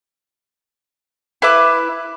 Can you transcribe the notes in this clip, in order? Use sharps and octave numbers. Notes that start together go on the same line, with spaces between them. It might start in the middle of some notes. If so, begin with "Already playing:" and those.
E4 B4 E5 D6